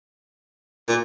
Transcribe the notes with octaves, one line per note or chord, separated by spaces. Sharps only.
A#2